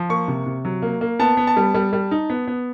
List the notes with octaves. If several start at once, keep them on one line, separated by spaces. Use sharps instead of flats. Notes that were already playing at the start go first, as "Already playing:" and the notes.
Already playing: F3
A#3 C#6
C3
C3
F#3
A#3
A#3
B3 A5
B3
A5
G3
G3
G3
D#4
B3
B3